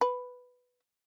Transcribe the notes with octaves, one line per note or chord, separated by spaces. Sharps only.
B4